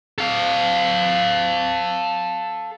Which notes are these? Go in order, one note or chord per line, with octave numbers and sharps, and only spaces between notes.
A4 F5